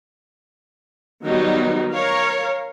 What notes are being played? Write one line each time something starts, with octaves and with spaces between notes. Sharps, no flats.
D#3 F#3 G3 B3 D#4
A#4 C#5 F5